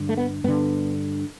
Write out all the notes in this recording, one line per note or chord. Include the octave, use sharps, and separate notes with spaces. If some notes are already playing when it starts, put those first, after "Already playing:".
Already playing: G2 D3
A3
B3
G2 D3 B3